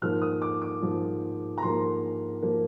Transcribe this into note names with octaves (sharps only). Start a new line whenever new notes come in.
G#2 F3 A#3 F6
D#6
D6
D6
G#2 F3 A#3
A#5
G#2 F3 A#3 C6
F3 A#3